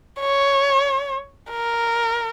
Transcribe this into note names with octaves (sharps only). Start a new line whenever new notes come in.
C#5
A#4